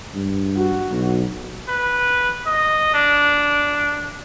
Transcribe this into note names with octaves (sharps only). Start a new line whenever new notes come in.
G2
F#4
B1
B4
D#5
D4